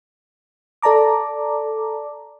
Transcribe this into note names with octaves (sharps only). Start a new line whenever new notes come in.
A4 D5 A5 A#5 D6